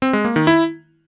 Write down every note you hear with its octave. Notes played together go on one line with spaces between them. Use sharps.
C4
G#3
A#3
D#3
E4